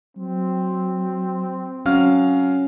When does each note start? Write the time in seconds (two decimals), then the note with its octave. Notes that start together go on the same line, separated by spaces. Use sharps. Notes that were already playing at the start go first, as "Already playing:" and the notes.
0.17 F#3 C4
1.86 F#3 C#4 F5 F6